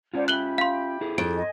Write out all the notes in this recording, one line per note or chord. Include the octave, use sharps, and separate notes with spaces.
C#4 F4 C5 D5 F#5
G4 E5 B5 F#6 F#7 G7
F5 C6
E4 G#4 A4
F2 D7
D#5 G#5